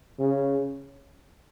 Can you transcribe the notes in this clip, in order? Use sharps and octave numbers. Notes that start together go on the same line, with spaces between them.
C#3